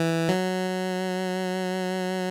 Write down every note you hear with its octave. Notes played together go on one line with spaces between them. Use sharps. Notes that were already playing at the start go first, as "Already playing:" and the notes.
Already playing: E3
F#3